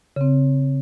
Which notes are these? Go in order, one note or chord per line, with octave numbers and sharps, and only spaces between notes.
C#3 C4